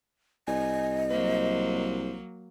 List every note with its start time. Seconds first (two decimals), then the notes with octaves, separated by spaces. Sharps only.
0.48 C2 D#5 G#5
1.11 F#3 A#3 C5